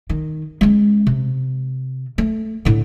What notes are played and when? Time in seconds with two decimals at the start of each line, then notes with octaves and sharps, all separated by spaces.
0.10 D#3
0.61 G#3 C#4
1.07 C3
2.18 A3
2.65 A2 D3